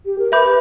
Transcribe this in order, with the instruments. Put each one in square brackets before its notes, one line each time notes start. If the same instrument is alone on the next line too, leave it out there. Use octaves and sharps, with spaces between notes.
[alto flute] G4
A#4
[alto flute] B4 [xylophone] E5 B5 D6 G6